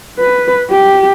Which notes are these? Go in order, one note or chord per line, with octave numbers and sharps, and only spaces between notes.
B4
G4